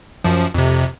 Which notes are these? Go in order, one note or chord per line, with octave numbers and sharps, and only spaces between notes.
F#2 F3
F2 C3